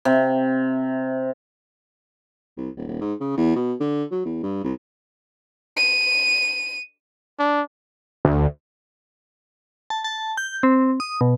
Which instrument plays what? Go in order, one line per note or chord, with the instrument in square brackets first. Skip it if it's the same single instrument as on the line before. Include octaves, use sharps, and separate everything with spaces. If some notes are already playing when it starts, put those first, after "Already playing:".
[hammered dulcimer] C3
[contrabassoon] C2
D#1
D#1
G#2
C#3
E2
B2
D3
F#3
E2
G2
C2
[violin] D#7
[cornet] D4
[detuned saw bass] D2
[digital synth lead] A5
A5
G6
C4
D#6
B2